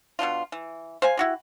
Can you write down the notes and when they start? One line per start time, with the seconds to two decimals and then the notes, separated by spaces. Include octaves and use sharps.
0.19 B2 F3 D4 F4
0.52 E3
1.02 C5 F5 G#5
1.17 E4 F#4 G4